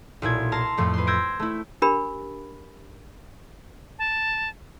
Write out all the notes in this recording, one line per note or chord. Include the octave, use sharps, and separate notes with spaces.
B1 A#2 E4 G#6
A#4 A5 C6
F2 A2 F3 A3
B4 C6
E6 G6 G#6 A#6 D7
A3 E4
D4 G4 A#4 B5
A5